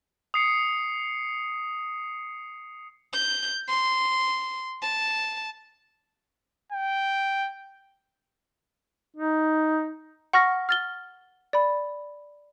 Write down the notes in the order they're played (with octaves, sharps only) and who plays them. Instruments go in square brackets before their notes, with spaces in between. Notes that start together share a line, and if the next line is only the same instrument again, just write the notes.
[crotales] D#6 C7 C#7
[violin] G6
C6
A5
[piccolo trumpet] G5
[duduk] D#4
[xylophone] F#5 C#6 F6 A#6
F6 A6 G7
D5 B5